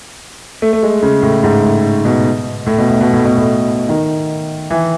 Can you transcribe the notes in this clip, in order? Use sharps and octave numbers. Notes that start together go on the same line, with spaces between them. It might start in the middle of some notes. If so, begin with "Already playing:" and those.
A3
A3
G#3
C#3
A2
G#2
A2
B2
A2
B2
A2
B2
A2
B2
A2
D#3
E3